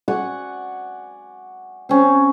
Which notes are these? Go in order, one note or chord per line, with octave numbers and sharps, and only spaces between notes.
D5 F#5 G#5 C#6
C4 C#4 C5